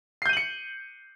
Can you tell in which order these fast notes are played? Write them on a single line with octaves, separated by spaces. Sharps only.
C7 G6 D#7 F#7 C#7